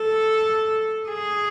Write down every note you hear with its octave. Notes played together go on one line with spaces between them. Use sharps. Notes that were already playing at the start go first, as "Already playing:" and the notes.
Already playing: A4
G#4